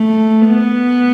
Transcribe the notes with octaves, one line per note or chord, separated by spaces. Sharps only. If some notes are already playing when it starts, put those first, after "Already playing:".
Already playing: A3
B3